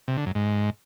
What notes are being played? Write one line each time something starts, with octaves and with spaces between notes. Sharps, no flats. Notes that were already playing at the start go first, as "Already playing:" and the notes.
C3
D3
F#2
G#2